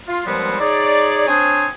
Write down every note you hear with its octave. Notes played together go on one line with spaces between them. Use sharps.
F4
D#2 F3 G3 G#3 B3 C4
D#4 G#4 C#5 D5
C4 D4 C5 C#5 G#5 D#6